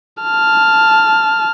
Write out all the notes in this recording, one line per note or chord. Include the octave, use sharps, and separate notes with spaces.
A5 F6